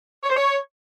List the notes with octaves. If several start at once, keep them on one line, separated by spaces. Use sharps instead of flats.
C#5
C5
C#5